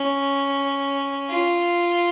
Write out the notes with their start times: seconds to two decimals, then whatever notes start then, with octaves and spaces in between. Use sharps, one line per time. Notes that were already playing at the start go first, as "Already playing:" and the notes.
Already playing: C#4
1.30 F4